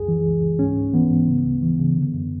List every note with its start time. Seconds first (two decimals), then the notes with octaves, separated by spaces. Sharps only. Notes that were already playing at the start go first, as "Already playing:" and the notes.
Already playing: C#2 F#2 G#4
0.08 E3
0.25 C#2
0.42 C#2
0.59 G#2 C#4
0.77 G#2
0.94 E3 B3
1.11 G#2
1.28 C#3
1.45 D2
1.62 E3
1.79 C#3
1.97 D3
2.14 F#2